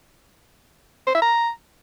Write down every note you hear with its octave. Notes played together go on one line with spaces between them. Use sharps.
C5
E5
A#5